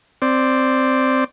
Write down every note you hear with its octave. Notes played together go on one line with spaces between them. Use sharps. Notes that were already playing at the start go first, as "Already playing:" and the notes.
C4 D5